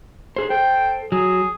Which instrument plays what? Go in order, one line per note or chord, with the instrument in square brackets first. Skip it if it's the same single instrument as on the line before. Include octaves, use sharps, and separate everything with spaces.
[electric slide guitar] G#4 C5
[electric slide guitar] A4 C5 [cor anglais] G5
[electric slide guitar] F#3 [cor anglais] G#4